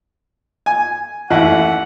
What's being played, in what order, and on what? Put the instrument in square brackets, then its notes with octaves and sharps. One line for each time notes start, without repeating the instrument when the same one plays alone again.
[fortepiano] G#5
[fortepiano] A1 D#2 E4 [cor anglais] F#5